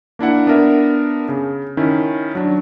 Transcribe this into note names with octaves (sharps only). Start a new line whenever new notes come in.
A#3 D4 E4 F#5
B3 D4 A#4 E5
C#3
D#3 C#4 E4
F#3 D4